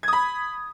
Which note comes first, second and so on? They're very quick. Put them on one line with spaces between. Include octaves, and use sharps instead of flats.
G#6 D#6 B5